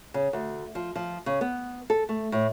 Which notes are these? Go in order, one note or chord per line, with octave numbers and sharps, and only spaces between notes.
C#3
D2
F3
F3
C#3
B3
A4
A3
A2